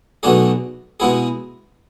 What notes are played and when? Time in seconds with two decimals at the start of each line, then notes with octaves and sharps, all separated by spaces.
0.23 B1 B2 A3 D4 G#4
1.00 B2 G#3 B3 E4 G#4